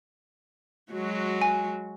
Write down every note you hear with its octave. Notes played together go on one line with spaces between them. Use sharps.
F#3 G#3 F#4
G#5